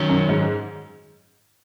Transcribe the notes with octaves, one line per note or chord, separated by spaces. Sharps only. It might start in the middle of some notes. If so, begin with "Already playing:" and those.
Already playing: D#3 F#3 C#4
F#2
G#2